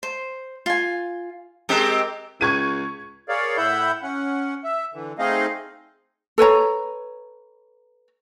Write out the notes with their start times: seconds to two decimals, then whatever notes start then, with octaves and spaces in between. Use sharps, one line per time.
0.03 C5
0.66 F4 G#5
1.69 G#3 C4 G4 A#4
2.41 C#2 C#6 G#6 D#7
3.29 G#4 A#4 C#5 D5 F5
3.57 A2 E4 E5 F#5 B5 G6
4.02 C#4 F#5
4.64 E5
4.94 D3 E3
5.19 A3 C4 D#4 G#4 D#5 F5
6.38 A4 B4 C#5 A#5